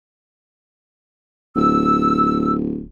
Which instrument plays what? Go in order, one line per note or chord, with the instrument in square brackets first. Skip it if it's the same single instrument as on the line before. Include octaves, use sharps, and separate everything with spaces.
[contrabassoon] D1 [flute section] E6